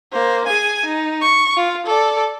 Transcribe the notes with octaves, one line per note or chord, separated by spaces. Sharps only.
A#3 C5
G#4 G#5
D#4
C#6
F4
A4 D5